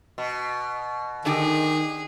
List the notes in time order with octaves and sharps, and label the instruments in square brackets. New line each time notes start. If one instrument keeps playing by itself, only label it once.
[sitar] B2
[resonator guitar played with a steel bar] D3 D#4 G4 [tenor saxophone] D#3 [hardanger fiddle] G#4